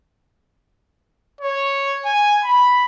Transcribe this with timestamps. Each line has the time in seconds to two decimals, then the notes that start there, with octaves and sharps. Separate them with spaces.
1.41 C#5
2.05 G#5
2.44 B5